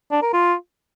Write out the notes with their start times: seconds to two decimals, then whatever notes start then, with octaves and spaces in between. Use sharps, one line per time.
0.12 D4
0.22 A#4
0.33 F4